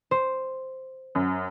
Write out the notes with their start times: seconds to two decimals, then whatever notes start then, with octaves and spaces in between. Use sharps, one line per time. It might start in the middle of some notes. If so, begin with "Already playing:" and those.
0.11 C5
1.15 F#2